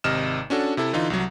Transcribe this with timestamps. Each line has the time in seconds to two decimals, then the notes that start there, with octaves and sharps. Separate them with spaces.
0.04 G#1 C3 D#5 F6 E7
0.50 C#4 D4 F#4 A4
0.77 C3 E4 A4
0.93 D3 E3 D#4 F4
1.10 C2 F#3